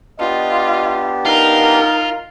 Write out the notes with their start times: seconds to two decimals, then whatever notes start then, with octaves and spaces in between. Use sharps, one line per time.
0.20 B3 D4 F4 G4 D#5
1.25 D#4 F4 A#4